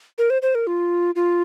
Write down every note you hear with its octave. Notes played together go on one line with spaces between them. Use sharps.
A#4
C5
C5
A#4
F4
F4